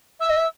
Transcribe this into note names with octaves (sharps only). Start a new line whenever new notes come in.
E5 E6
D#5
E5